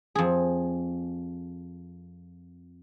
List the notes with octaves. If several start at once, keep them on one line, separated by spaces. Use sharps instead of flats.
F2 G#4